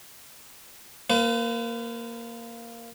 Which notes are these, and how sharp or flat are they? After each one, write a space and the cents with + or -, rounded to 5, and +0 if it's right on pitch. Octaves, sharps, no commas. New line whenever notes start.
A#3 -5 B4 +45